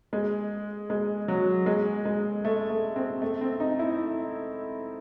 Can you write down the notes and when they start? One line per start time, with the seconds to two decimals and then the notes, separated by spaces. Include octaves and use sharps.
0.13 G#3
0.90 G#3
1.28 F#3
1.66 G#3
2.05 G#3
2.45 A3
2.70 A3
2.96 C4
3.22 A3
3.41 C4
3.60 D#4
3.79 E4